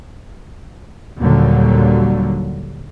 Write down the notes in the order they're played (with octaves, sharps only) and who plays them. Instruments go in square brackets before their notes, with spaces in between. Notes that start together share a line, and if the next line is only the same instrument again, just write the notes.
[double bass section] D#2 A#2 D3 F#3 G3